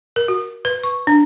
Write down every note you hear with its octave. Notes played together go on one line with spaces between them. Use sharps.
A#4
F#4
B4
C#6
D4